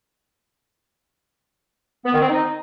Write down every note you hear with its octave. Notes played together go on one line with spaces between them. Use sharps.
B3
D#3
C4
D#4